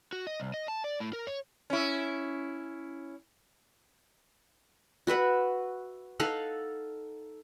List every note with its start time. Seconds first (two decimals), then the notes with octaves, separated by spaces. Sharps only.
0.13 F#4
0.27 D#5
0.40 C2
0.54 D#5
0.68 A5
0.84 D5
1.00 A2
1.13 A#4
1.27 C#5
1.70 C#4 E4
5.07 F#4 B4 E5 F#5
6.20 D#4 A4 F5 F#5